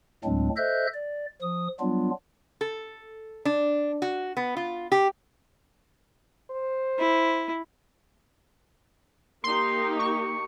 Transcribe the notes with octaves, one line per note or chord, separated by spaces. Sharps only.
D2 A2 F#3 G#3 C4 D4
A4 C5 D#5 E5 F#6 G6
D5
F3 D#6
F#3 G3 B3 D4 F4
A4
D4
F#4
B3
F4
G4
C5
E4
A#3 D#4 G4 C6
C#6